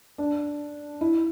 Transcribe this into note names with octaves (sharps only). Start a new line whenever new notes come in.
D4
E4